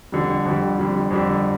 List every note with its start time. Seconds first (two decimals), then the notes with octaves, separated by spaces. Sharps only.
0.12 F2 D3 G3
0.45 F2 D3 G3
0.78 F2 D3 G3
1.11 F2 D3 G3